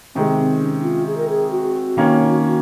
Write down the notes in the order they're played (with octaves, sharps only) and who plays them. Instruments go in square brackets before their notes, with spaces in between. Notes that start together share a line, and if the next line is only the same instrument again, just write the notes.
[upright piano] C3 D#3 G#3 [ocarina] C4
[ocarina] C4
C#4
F4
G#4
A#4
G#4
F#4
[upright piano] D#3 A#3 C#4